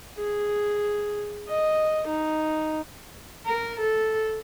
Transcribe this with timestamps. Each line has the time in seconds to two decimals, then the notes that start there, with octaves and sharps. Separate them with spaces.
0.18 G#4
1.49 D#5
2.08 D#4
3.46 A#4
3.80 A4